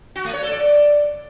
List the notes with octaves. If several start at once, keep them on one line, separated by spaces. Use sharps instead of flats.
F#4
A3
C#5
A4
D5